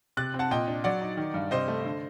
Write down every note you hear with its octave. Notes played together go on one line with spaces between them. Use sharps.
C3 F#6 A6
C4
F#5 A5
A#2 D#5 G5
D4
F#3 D5 F#5
D#4
D#3
G2
C3 C5 D#5
A3
D3